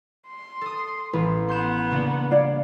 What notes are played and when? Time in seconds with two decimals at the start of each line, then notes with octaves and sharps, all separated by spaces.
0.28 C6
0.61 A4 D#6
1.13 A1 B4
1.49 B3 C6 G6 E7
1.91 C#3 A#3 D4
2.31 C#5 D5 F5